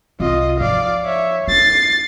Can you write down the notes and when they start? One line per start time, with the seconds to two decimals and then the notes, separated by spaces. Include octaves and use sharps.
0.20 C2 C4 F4 D#5
0.60 G#2 F3 D5 F5
1.05 C#5 E5
1.48 C#4 A6 C7